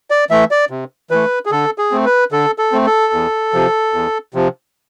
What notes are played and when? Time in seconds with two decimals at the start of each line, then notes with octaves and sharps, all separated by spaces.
0.10 D5
0.30 E3 A3 E5
0.51 D5
0.70 C3
1.10 E3 A3 B4
1.46 G#4
1.51 D3 A4
1.78 G#4
1.91 A3 C4
2.06 B4
2.32 D3 A4
2.58 A4
2.72 A3 C4
2.86 A4
3.13 E2
3.53 C3 F3
3.93 E2
4.34 C3 F3